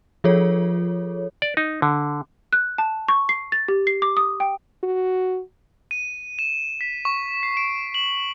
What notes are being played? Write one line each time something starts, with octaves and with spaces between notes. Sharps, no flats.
F3 F4 G#4 A4 C#5
D5
D#4
D3
F#6
A5
C#6
C7
A6
G4
C7
D6
D#6
G5
F#4
D#7
E7
B6
C#6
C7
D7
F#7